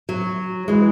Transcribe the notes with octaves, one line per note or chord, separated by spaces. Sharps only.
F#3
E3 G#3